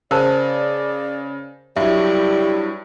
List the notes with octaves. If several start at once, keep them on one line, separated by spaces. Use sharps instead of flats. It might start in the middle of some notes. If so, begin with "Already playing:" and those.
C#3 A#4 C5 D5 A5
G2 F#3 G3 E4 E5